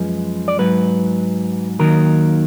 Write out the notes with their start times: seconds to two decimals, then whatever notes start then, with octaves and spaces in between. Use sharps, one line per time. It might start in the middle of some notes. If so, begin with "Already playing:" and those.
Already playing: F#2 F3 G#3 B4
0.48 D5
0.59 G#2 F#3 B4
1.79 D#2 D#3 F#3 A#4